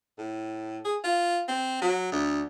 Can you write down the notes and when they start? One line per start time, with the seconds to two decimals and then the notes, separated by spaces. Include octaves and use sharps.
0.18 A2
0.85 G#4
1.04 F4
1.48 C4
1.82 F#3
2.12 D2